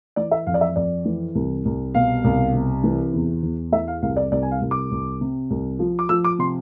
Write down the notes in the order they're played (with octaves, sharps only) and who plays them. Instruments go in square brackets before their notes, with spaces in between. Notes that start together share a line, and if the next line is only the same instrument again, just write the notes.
[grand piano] E3 D5
E5
F2 F5
D5
E5
F2 D5
E3
C2
C2
B2 F5
C2
C3
E3
E2
E2
E3 E5
F5
C2 F5
D5
C2 D5
G#5
F5
C2
D6
C2
C3
C2
F3
D6
F3 E6
D6
C3 C6